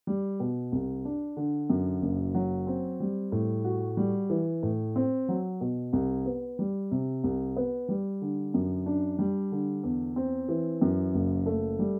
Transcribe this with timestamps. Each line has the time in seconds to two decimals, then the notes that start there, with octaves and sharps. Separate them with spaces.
0.07 G3
0.40 B2
0.72 C2
1.05 D4
1.37 D3
1.70 F#2
2.02 F#1
2.35 F#3
2.67 C4
3.00 G3
3.32 A2
3.65 F#4
3.97 G3
4.30 E3
4.63 A2
4.96 C4
5.29 F#3
5.61 B2
5.93 C2
6.26 B3
6.59 G3
6.91 C3
7.24 C2
7.56 B3
7.89 G3
8.22 D3
8.54 F#2
8.86 D4
9.19 G3
9.52 D3
9.83 E2
10.16 C4
10.49 E3
10.81 F#2
11.15 F#1
11.46 A3
11.79 G3